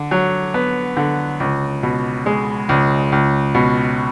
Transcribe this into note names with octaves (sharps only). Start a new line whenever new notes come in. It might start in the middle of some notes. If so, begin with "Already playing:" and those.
Already playing: D3
F#3
B3
D3
C#2
B2
G#3
C#2
C#2
B2